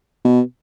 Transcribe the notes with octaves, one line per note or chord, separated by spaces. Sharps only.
B2